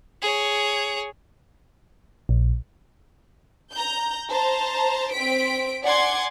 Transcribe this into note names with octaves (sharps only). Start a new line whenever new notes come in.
G#4 C#5
A#1
A#5 G6
C5 A5 A#5
C4 B6 D7
D5 F#5 G#5 C6 D6 G#6